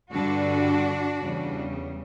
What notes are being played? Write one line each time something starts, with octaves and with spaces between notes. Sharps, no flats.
G2 D3 G3 D4 F#4
E2 C#3 G3